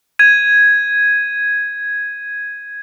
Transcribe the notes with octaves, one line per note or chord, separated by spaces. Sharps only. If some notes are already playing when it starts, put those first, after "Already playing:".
G#6 D#7